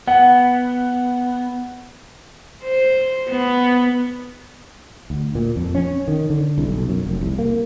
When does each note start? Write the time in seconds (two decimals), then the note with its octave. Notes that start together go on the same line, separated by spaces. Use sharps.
0.07 B3 F#5
2.64 C5
3.30 B3
5.10 D2
5.35 A#2
5.56 F2
5.75 C#4
6.08 D#3
6.30 D3
6.58 C2
6.69 B1
6.89 F#2
7.07 F1
7.21 C2
7.39 A#3